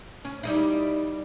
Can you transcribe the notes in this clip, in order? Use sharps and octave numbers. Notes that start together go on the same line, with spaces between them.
C#4
G3 D#4 E4